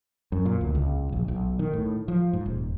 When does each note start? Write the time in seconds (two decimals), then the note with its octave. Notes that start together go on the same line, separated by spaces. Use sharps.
0.32 F#2
0.46 A#2
0.61 D2
0.75 C#2
1.12 A#1
1.28 B1
1.59 D#3
1.73 A2
2.08 F3
2.33 G#2
2.46 D#1